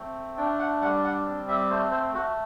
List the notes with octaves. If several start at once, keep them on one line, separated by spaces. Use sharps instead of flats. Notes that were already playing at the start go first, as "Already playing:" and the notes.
Already playing: A3 C4
D4 G5
F#5
G3 F#5
F#5
C4
E5
A3 C5
C5
A3 F#4